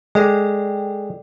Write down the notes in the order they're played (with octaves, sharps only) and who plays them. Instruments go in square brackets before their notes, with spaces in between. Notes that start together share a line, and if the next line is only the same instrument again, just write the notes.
[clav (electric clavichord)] G#3 [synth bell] A4 D5 G5